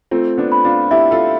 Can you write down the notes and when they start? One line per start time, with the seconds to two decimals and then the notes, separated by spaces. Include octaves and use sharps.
0.11 A3 C4 F4
0.38 B3 D4
0.52 B5
0.65 D4 F4
0.91 E4 G4 E5
1.11 F4 A4